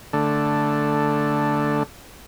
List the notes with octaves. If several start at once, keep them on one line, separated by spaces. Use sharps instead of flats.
D3 A3